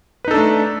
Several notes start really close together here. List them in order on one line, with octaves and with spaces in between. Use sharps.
B4 D#4 A4 D4 A3